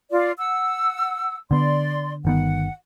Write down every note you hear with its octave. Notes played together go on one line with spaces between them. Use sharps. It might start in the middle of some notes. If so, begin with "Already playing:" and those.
F4 D5
F#5 E6
D3 B3 D5 C6
G1 D#3 B3 F#5